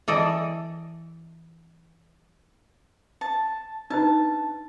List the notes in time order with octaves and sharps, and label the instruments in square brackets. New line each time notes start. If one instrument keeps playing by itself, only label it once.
[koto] E3 A4 D5 D#5
[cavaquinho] A5
[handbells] D4 D#4 B4 [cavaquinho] A5